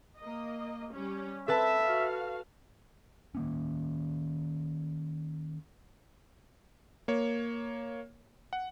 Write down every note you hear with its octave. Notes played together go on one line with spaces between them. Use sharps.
A#3 D#5
G3 C#4
C4 A4 B4 E5 A5
F#4 F5
D#3 A#3 C#4
A#3 C#5
F#5